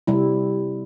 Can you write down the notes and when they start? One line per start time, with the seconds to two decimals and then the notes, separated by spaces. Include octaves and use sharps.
0.07 C3 G3 E4